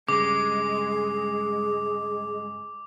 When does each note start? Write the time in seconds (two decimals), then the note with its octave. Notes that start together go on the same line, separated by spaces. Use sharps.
0.08 G2 C#3 G#3 G#4 D6